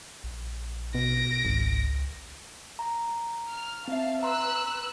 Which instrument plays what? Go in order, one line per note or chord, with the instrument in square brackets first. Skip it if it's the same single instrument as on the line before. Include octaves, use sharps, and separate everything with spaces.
[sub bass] A#1
[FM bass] B2 [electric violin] A#6 D7
[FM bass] G#1 [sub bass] C#2
[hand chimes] A#5
[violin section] F6
[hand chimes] C4 E5 [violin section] F5 A5
[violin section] B4 E6 F#6 [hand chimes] A#5 C6